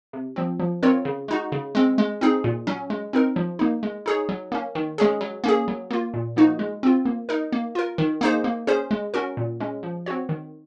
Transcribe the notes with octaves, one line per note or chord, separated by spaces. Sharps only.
C3
F3 C4
F3
C4 F4 A#4 C#5
C#3
G#3 D#4 F#4
C#3
G#3 C4
G#3
C4 D#4 G#4
A#2
F#3 C#4
G#3
C4 D#4 A#4
F3
A#3 D#4
G#3
D#4 G#4 C#5
F#3
A#3 C#4
D#3
G#3 C#4 G#4
F#3
A#3 C#4 G#4
F#3
A#3 F4
A#2
F3 A#3 D#4 F#4
G#3
C4 F4
A#3
D#4 A#4
A#3
F4 A#4
D#3
A#3 D#4 G#4 C5
A#3
C#4 G#4 C5
G#3
C#4 F#4 A#4
A#2
G#3 C#4
F3
C4 F#4 C#5
D#3